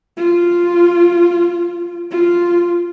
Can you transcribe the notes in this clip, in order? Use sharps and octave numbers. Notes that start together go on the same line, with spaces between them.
F4
F4